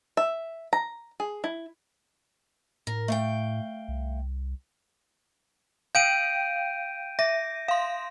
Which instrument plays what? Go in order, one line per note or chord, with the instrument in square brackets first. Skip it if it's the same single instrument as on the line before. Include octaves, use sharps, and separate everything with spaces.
[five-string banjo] E5
A#5
G#4
E4
[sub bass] A2 [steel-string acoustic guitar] A#4
[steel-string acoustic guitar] A3 F5 G5
[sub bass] C2
[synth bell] F5 G5 [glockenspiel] G6 D7 D#7
[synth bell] E5 [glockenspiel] A#6
[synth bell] F5 C6